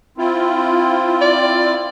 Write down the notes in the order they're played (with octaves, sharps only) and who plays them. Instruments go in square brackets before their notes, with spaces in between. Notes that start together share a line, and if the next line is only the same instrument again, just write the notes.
[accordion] C4 E4 F4
[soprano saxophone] D5